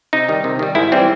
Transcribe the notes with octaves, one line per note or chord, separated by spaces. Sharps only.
C3 D#4
D#3 G3
C3
D#3 G3
G#2 E4
E3 G3 C4